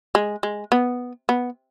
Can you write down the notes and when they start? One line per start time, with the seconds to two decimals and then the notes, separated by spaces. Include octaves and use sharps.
0.15 G#3
0.43 G#3
0.72 B3
1.29 B3